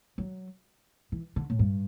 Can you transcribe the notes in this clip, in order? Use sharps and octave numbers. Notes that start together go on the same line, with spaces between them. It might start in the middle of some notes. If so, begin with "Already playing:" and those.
F#3
E3
D3
A2
G2